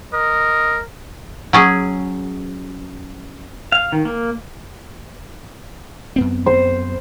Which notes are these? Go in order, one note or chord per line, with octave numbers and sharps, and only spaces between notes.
A#4 D#5
F#3 C#4 G#4
F5
D#3
A#3
F#2 B3 C4
C5